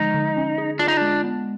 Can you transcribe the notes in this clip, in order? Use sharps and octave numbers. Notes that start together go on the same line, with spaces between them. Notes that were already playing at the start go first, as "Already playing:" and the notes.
Already playing: D3 F3 G#3 D#4
D3
C#4
G#4
D4 F4
D#4
G#3 D4
B3